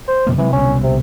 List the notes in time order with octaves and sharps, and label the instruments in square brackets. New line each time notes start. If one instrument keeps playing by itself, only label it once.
[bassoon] C5
[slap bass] F2 B2 A#3
[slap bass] C3 F#3 G#3 [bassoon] E3
[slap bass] C2 B2 D3 [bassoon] C#4
[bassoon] C3